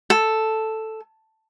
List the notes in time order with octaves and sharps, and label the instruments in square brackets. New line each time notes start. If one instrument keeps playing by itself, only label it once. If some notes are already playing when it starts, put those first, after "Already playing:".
[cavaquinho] A4